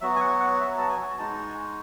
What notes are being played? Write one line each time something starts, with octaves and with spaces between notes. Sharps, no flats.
F#3 B3 F#4 E5
G#5
F#5
F#5
E5
A5
G#5
G#3 D#4 F#4 A5
G#5